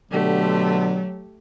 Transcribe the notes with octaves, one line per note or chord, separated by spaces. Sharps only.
B2 D3 F#3 A3 G4